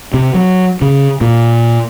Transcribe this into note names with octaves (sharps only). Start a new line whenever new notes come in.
C3
F#3
C#3
A#2